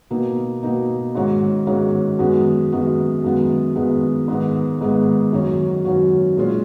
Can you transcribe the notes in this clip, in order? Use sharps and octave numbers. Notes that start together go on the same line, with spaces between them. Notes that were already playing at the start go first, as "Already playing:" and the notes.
B2 A#3 D#4
B2 A#3 D#4
G#2 D#3 G#3 C#4 F#4
G#2 D#3 G#3 C#4 F#4
F#2 D#3 G#3 B3 F#4
F#2 D#3 G#3 B3 F#4
F#2 D#3 G#3 B3
F#2 D#3 G#3 B3
G#2 D#3 G#3 B3
G#2 D#3 G#3 B3
F#2 D#3 F#3 C#4 F#4
F#2 D#3 F#3 C#4 F#4
A#2 G#3 C#4 F4